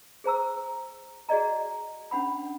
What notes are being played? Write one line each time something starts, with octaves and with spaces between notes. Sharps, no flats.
G#4 C5 A#5 E6
F#4 G#4 D5 D#5 A#5
C#4 D4 F#5 B5